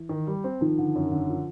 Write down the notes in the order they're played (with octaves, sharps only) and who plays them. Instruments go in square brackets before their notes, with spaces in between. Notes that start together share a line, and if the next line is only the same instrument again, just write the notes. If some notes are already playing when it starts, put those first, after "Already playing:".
Already playing: [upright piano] E3
[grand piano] D#3
G3
C4
[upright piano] D#3 [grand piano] F3
[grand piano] D3
F#2
D3
F3